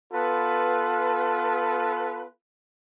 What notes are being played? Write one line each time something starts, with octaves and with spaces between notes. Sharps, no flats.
B3 F4 A4 B4